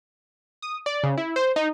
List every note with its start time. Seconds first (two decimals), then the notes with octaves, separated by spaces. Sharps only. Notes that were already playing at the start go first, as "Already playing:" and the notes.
0.62 D#6
0.86 D5
1.03 C#3
1.18 E4
1.36 C5
1.56 D#4